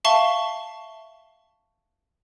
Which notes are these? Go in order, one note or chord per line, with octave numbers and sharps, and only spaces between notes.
E5 F5 A5 C#6 G7